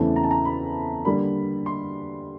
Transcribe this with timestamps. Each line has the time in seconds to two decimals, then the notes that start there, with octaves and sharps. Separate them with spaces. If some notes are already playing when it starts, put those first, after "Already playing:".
Already playing: E2 C#3 E3 A3 C4 A5
0.16 A#5
0.24 A5
0.31 A#5
0.45 B5
1.05 D3 G3 A#3 B5
1.66 C6